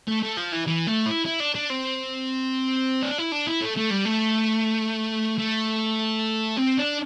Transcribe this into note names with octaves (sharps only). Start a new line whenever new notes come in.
A3
A3
F3
E3
E3
A3
E4
E4
D4
D4
C4
D4
E4
D4
E4
A3
A3
G3
A3
A3
C4
D4